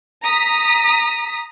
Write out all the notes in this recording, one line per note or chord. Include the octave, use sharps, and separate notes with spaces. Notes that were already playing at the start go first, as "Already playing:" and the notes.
A#5 D#6 B6